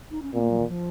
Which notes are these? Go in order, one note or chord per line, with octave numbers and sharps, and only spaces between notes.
D#4
C#4
A#2 C4
A#3
F#3
D#3
F3